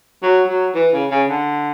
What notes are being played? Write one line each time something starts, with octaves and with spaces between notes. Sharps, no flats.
F#3
F#3
E3
C#3
C#3
D3